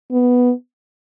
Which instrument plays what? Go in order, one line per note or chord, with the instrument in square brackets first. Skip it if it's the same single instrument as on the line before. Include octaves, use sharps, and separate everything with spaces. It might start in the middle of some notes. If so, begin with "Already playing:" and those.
[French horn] B3